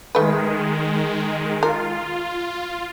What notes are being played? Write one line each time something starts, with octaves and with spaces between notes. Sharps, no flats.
D#3 G#3 A3 B4
F4 A#4